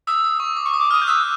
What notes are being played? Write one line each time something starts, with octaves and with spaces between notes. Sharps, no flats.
D#6 E6
D#6
C#6
D6
C#6
D#6
D6
D#6 F6
G6
E6 F#6